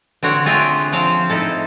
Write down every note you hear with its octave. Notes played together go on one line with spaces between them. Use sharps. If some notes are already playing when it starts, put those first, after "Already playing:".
D3 C4 F#4 C#5 F#5
F4 G#4 E5 G5
F3 C4 C5 F5
D#4 E4 A4